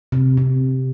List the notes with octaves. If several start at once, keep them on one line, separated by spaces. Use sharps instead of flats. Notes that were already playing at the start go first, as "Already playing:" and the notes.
C3
C3